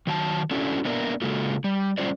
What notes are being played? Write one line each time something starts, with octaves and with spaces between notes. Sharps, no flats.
D#3 F#3 G#5 A5
C#4 D4 E4 F#4 A4
A#3 B3 D4 A#4 D5 E5
C#3 G#3 A#3 F4 F#4 A4
G3
G3 A3 C#4 F4 C5 D5